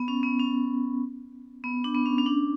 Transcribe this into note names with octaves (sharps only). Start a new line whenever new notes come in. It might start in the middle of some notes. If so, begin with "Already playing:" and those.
Already playing: B3
C#4
B3
C#4
B3
D4
B3
C#4
C#4
D4